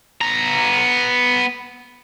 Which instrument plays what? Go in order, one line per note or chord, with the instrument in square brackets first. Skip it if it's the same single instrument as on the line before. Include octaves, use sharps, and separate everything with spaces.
[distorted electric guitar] B3 A#5